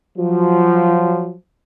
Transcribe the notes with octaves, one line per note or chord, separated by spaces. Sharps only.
F3 F#3